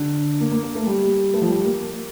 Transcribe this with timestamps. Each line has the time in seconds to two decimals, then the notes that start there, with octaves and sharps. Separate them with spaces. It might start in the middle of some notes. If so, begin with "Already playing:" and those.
Already playing: D3
0.40 A#3
0.51 A#3
0.63 A#3
0.75 A3
0.87 G3
1.34 A3
1.42 F3
1.48 G3
1.65 A#3
1.81 A#3